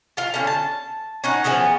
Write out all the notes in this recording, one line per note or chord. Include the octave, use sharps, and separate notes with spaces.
F4 F5
D3 C#4
A5
C#4 D#4 F#5
C#3 E3 F3 B3